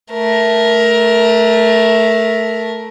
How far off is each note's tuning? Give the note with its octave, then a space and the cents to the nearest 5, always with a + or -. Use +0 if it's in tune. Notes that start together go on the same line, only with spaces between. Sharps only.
A3 +0 A#4 +15